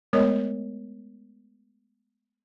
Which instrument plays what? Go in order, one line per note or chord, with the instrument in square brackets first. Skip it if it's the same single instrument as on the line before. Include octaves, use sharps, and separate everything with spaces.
[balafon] G#3 A3 B3 A#4 C#5 D#5